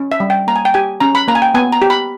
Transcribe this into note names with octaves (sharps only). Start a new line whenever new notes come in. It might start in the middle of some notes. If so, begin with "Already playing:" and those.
Already playing: C#4
E5
G3
G5
A#3 A#5
G#5
G5
G4 G#5
C#4 A#5
B5
A#3 A#5
G#5
G5
B3 G#5
A#5
G4
B5